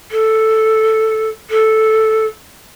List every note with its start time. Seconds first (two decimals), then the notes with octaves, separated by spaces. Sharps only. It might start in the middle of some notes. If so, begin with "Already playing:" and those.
0.11 A4
1.50 A4